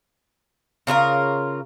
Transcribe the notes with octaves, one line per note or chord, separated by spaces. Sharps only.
C#3 D4 F4 A#4